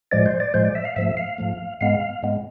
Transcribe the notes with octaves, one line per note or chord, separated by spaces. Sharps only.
A2 F3 G#3 D5
C5
D5
A2 F3 G#3 C5
D5
E5
F5
G#2 F3 A3 E5
F5
G#2 F3 A3
G#2 G#3 B3 F5
G#2 G#3 B3